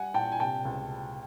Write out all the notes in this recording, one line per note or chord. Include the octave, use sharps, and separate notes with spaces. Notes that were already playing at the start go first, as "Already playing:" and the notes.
Already playing: G3 F#5 G#5
A#2 G5 A5
G#5
C3 G5 A5
C#2